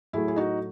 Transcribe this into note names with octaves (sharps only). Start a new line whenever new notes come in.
A2 F#3 A3 E4 G#4
G#4
D#4 F#4